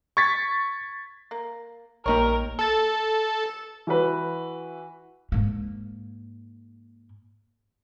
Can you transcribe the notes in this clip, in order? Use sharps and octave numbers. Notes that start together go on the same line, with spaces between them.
C#6 G#6 A6 B6
A#3
A#1 G3 A#3 D#4 A#4 C#5
A4 A6
E3 F#4 B4
G#2 A#3